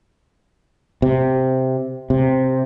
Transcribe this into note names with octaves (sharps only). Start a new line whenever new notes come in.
C3
C3